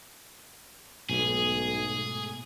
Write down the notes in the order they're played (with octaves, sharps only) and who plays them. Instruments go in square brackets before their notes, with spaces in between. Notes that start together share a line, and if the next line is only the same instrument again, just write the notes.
[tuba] B1 [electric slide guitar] G#2 B2 A3 [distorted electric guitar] G#4